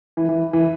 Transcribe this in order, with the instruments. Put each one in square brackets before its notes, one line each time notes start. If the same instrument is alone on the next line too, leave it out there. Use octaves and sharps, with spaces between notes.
[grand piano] E3
E3
E3